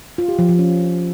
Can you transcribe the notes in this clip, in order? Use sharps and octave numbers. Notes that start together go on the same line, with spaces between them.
F4
G4
F3
F3
C#4